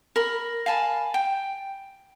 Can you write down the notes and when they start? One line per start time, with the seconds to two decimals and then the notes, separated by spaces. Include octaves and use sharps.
0.16 A#4 B5
0.66 F5 G#5 A5 B5
1.14 G5